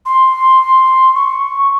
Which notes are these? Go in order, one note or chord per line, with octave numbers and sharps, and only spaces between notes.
C6
C#6